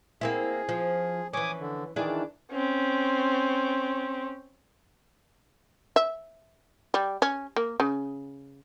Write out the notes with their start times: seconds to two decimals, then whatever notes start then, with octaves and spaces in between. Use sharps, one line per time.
0.21 A#3 C4 E4 G#4
0.69 F3
1.33 E3 C#4 G#5 D6 D#6
1.60 D3
1.96 D#3 E3 D4 E4 G#4
2.52 C4 C#4
5.96 E5
6.94 G3
7.22 C#4
7.56 A#3
7.80 C#3